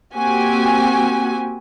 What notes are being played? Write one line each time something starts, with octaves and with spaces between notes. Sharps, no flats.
A#3 C4 F#4 G4 G#5